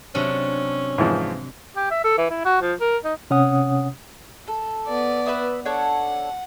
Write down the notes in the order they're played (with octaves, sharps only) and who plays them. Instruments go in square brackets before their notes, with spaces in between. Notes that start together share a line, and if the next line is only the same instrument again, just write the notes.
[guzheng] C3 F#3 D4 [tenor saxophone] C#4
[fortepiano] G#2 E3 F3
[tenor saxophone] G4
E5
A4
E3
E4
F#4
F3
A#4
D#4
[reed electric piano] C3 C#4 C#5 F#5 D#6
[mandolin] A4
[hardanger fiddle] B3 D5
[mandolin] B4 E5 D#6
[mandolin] D4 A4 C#5 [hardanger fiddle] F#5